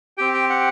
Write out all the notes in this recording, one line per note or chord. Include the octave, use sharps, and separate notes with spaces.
C4 G4 G5
G5
F#5